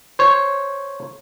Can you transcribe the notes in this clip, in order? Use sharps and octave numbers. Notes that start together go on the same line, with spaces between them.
C5 C#5